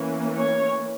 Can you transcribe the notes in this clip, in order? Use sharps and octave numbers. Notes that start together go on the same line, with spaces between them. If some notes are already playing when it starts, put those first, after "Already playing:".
Already playing: E3 A#3 C#4
C#5